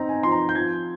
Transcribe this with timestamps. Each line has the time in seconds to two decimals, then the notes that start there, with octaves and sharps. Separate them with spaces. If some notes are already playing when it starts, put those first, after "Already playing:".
Already playing: C4 D#4 A#5
0.09 G#5
0.23 F3 C6
0.32 A#5
0.49 G6
0.55 F3 G#6